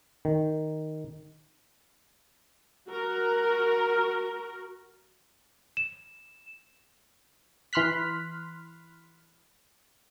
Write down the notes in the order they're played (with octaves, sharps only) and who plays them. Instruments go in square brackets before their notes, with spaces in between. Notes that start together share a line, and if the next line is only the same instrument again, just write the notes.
[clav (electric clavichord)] D#3
[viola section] F#4 A#4
[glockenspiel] E7
[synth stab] E3 B5 C6 F6 F#6 B6